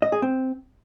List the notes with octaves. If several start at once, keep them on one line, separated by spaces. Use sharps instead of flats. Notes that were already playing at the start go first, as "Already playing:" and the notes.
D#5
G#4
C4